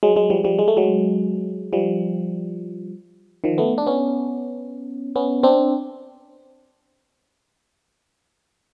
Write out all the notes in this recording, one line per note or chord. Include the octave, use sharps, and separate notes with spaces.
F#3 G#3
F#3 G#3
F3 G3
F3 G3
G#3
A3
F#3 G#3
F3 G3
D#3 F3
A3 B3
D4
B3 C#4
B3 C#4
C4 D4